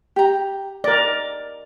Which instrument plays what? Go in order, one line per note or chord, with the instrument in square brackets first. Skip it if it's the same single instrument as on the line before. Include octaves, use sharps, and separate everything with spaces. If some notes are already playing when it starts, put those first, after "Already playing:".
[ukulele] G4 A#5
[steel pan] A#4 D5 [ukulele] D#5